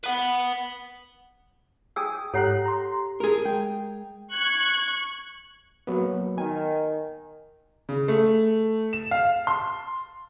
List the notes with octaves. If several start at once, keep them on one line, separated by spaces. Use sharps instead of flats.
B4 F#5
G#4 G5 G#5 D#6 E6
G#2 G4 A4 C#5 F#5 A#5 F#6
A#5 C6
G#4 A#4
G#3 G5
C#6 F#6 G#6
F#3 A#3 B3
D#3 G#5
C#3
A3
E7
F5
C6